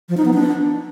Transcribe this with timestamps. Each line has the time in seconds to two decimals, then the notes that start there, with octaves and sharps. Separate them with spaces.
0.09 F3
0.17 D#4
0.25 B3
0.33 D4